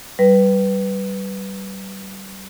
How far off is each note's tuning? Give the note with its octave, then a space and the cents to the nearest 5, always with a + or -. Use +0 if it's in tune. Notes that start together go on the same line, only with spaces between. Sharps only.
G3 -25 B4 +0